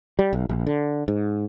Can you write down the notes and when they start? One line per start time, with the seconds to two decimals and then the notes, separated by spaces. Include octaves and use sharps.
0.19 G3
0.33 B1
0.49 A#1
0.67 D3
1.08 G#2